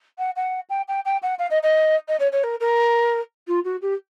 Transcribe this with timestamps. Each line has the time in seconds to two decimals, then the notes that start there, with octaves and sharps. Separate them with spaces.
0.18 F#5
0.36 F#5
0.69 G5
0.88 G5
1.05 G5
1.22 F#5
1.39 F5
1.50 D#5
1.63 D#5
2.08 D#5
2.19 C#5
2.32 C#5
2.43 A#4
2.60 A#4
3.47 F4
3.64 F#4
3.81 G4